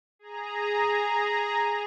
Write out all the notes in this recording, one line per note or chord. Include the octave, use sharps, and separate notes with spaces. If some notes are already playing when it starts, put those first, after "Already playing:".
G#4 A#5